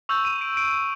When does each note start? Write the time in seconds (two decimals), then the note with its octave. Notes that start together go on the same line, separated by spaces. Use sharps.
0.09 C#6 E6 G6 F7
0.25 D#7
0.41 D7
0.57 D7